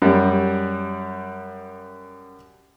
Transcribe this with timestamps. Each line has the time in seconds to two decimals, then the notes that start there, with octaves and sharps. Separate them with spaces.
0.02 F#2 G3